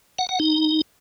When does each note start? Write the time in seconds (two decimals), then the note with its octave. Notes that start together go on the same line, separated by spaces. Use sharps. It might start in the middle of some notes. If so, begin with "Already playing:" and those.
0.19 F#5
0.29 F#5
0.40 D#4